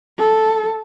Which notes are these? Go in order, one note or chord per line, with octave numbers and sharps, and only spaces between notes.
A4